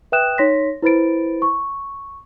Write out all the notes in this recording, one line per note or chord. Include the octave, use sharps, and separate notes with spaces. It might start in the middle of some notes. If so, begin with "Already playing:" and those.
B4 E5 G5 D#6 F#6 E7
D#4 C#5 C6 A#6 B6
E4 B4 C5 B5 A6 D7
C#6